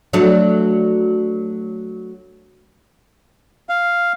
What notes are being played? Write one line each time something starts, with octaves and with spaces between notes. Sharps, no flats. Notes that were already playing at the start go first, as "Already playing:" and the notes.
F#3 A3 D4
F5